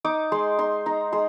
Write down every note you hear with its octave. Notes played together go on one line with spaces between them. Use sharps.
D#4 D6
G#3 C6
D#4 C6
D#4 A#5
G#3 C6